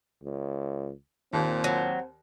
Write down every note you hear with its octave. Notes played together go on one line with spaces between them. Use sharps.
C#2
D#2 A#2 C4
F#3